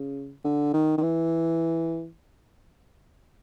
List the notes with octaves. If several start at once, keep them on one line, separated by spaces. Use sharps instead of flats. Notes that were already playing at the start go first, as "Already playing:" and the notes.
Already playing: C#3
D3
D#3
D#3
E3